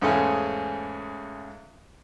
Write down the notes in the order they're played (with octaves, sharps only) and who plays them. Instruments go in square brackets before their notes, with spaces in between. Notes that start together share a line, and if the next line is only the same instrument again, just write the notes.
[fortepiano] E2 G#2 C#3 G#3 A3 C#4